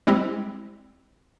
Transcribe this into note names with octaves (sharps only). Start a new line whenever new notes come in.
G3 G#3 C4 E4 G4